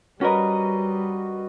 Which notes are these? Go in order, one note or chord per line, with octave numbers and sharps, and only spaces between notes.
G3 C#4 F#4 A#4 B4 D#5